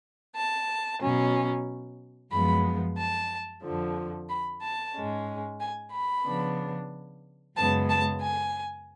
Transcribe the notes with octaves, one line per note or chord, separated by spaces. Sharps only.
A5
B2 F#3 C#4
F#2 F3 G#3 B3 B5
A5
F2 D3 F3
B5
A5
G#2 G#3 C#4
G#5
B5
C#3 F3 B3 D4
F#2 C#3 G#3 B3 A5
A5
G#5